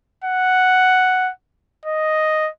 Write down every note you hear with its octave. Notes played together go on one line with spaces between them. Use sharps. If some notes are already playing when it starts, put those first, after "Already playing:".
F#5
D#5